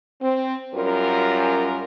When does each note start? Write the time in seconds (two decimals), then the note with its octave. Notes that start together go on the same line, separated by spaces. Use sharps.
0.22 C4
0.74 F#2 G3 C#4 F4 A#4